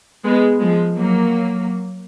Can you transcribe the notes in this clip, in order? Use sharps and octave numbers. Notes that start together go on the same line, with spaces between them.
G#3 B3
F3 G#3
F#3 A#3